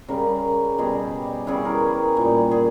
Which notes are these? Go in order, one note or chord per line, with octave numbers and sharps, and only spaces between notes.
C#3 G3 A#4
B2 G3 G#4
C#3 E3 G3 G#4
A#4
A#2 G3
G#4